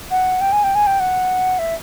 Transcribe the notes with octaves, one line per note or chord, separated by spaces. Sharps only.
F#5
G5
G#5
G5
G#5
G5
F#5
E5